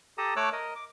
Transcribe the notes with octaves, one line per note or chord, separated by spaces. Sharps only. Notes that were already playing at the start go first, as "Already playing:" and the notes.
G4 A4 A5 A#5 D#6
A3 C#5 D6 E6 F#6
A#4 D#5
D6